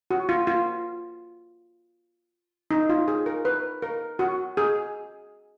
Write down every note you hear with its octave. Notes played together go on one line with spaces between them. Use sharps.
F#4
F4
F4
D#4
F4
G#4
A#4
B4
A#4
F#4
G#4